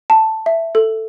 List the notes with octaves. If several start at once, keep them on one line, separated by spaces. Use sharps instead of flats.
A5
E5
A4